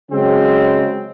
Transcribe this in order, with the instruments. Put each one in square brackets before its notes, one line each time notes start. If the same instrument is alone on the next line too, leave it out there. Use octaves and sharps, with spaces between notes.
[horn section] C#3 F#3 G#3 C4